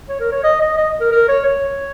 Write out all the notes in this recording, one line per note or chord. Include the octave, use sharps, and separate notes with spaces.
C#5
A#4
C#5
D#5
D#5
D#5
A#4
A#4
C#5
C#5